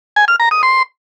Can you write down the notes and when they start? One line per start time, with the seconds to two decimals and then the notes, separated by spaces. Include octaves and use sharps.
0.16 G#5
0.28 F6
0.40 A#5
0.51 D#6
0.63 C6